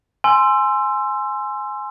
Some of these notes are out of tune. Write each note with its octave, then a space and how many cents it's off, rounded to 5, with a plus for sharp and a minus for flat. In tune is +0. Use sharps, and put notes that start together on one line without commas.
G#5 +10 C6 +0 E6 +20